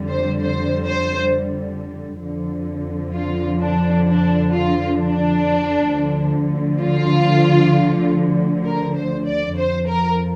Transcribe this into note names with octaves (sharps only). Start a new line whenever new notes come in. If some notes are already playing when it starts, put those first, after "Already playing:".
Already playing: F2 D3 G3
C5
C5
C5
F2 D3 F3
F4
D4
D4
F4
D4
D2 D3 F3
F4
A#4
C5
D5
F2 F3 C5
A#4